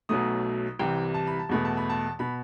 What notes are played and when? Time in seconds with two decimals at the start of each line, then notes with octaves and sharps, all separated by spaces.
0.09 B1 B2 F#3 A3 D#6
0.79 C2 C3 E3 G5
1.14 A5
1.27 B5
1.39 A5
1.49 E2 B2 A3 B5
1.65 A5
1.77 B5
1.90 A5
2.19 B2 B5